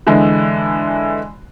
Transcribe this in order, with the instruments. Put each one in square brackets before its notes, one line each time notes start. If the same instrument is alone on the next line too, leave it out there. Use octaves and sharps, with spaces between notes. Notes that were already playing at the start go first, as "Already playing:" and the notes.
[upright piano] D3 E3 G#3